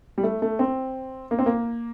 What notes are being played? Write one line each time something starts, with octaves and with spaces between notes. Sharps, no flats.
G3
A3
A3
C4
A#3
C4
A#3